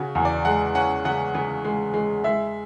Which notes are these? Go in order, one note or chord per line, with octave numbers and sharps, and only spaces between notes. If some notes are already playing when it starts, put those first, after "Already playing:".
Already playing: C#3 F#4
E2
D5
G#3 F#5
C#4 F#5
C#3 F#5
C#3
G#3
G#3
G#3 E5